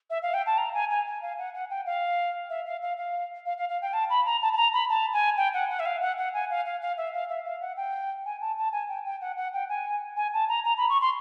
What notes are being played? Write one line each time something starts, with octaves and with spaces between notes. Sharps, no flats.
E5
F5
G5
A5
A#5
G#5
G#5
G#5
F5
F#5
F#5
G5
F5
E5
F5
F5
F5
F5
F5
F5
G5
A5
B5
A#5
A5
A5
A#5
B5
A5
G#5
G5
F#5
F#5
E5
F5
F#5
F#5
G#5
F5
F5
F5
E5
F5
E5
F5
F#5
G5
G#5
A5
A5
G#5
G5
G5
F#5
F#5
G5
G#5
G#5
A5
A#5
A#5
B5
C#6
C6